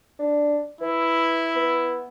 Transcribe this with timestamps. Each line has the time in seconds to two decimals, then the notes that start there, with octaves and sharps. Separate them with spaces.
0.19 D4
0.81 E3 E4
1.56 B3